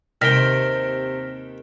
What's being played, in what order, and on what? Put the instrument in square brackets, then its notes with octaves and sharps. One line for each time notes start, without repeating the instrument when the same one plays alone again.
[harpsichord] D#2 D#3 G5 [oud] C3 [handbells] F6 A#6 B6